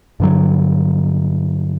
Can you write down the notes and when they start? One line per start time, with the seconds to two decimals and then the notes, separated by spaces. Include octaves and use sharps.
0.20 G2 D3 F#3